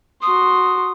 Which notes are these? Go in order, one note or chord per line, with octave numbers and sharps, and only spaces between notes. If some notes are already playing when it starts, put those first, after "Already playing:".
F#4 C6 D#6